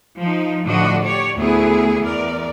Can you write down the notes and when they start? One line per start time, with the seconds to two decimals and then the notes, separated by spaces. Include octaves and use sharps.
0.19 F3 D#4
0.63 A2 D3 F3 D4 F#4 D#5
1.02 G4 C#5 D5
1.36 D2 B3 E4 G#4
2.04 E2 A#4 D5